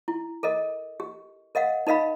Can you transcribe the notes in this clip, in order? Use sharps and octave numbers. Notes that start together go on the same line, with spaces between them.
E4
A4 A#4 D#5
G4
A#4 D#5 F5 F#5
D#4 A#4 D#5 F5 B5